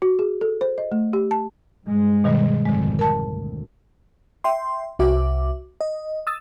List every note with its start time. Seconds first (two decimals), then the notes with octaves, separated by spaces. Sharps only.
0.02 F#4
0.19 G#4
0.41 A4
0.61 C5
0.78 D#5
0.92 A3
1.13 G4
1.31 A5
1.87 G2 G#3
2.24 B2 D#3 G3
2.65 G#1 F2 G#2 D3 G#3
2.99 A#4 A5
3.28 D2
4.44 E5 G5 C6
4.99 C2 F#4 E5 D6
5.81 D#5
6.27 D#6 E6 A6